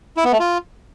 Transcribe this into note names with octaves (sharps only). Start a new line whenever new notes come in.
E4
B3
A3
F4